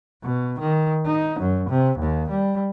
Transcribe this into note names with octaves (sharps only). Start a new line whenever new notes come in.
B2
D#3
D#4
F#2
C3
D#2
G3